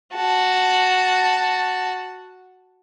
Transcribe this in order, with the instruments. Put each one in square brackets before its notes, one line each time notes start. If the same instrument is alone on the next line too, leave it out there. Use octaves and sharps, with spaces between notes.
[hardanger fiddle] F#4 A5